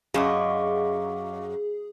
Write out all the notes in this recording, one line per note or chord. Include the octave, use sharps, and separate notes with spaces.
F#2 F#3 G#4 D#5 F5 C#6 D6